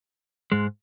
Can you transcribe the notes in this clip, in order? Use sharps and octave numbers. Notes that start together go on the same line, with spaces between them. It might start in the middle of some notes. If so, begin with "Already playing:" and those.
G#2 G#3